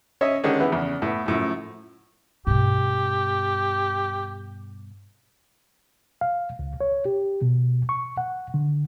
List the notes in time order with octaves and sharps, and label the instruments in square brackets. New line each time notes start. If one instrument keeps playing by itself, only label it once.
[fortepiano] C#4 C#5 D#5 E5
D3 D#3 G#3 C#4 D4
E3 B3
E2 C#3
A2 B3
F#2 A2 F3
[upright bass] G2 B2 [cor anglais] G4
[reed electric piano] F5
C#2
C#5
G4
B2
C#6
F#5
D3